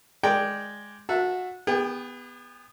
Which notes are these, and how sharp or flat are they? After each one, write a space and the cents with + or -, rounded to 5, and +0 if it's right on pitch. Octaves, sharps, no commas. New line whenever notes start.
G#3 +0 D5 +0 G5 +0
F#4 -20 E5 +10 A5 +0
B3 +0 G#4 -45 G5 +0